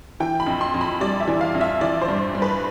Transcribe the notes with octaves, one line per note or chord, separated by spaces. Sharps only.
E3 G5
B5
F2
C6
F2
B5
G3 D5
E5
E3
F5
F2
E5
E3 D5
C5
G2
G2
B4